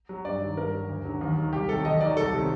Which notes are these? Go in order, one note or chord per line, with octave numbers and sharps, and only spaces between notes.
F#3
G2 D5
D#3 F#3
G2 A#4
F#3
D2
D3 F#3
D#2
D#3 F#3
C2 G4
C3 D#3 F#3 A4
D#2 D#5
D#3 F#3 D5
C2 A4
C3 D#3 F#3